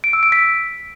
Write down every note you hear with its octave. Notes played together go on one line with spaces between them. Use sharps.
D7
E6
D7
B6